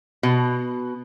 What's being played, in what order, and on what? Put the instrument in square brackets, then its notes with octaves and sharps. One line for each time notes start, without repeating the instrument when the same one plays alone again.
[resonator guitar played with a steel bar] B2